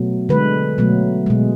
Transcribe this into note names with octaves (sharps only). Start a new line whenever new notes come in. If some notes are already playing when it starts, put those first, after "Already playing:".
Already playing: B2 F#3 A3
D3 G#3 B4
B2 F#3 A3
B2 G#3